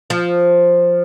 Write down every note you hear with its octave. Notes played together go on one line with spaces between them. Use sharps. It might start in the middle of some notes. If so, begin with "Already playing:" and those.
F3